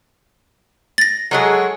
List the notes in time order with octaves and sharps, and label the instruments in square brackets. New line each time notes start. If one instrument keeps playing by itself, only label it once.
[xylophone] A6 A#6
[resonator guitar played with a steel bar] F#3 G#3 G#4 [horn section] A4 C#5 F#5